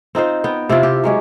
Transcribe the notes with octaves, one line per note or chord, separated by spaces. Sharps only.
C4 D#4 F4 C5
B3 G5
C3 C4 E4 F4
G4
F#3 G#3 G4 C#5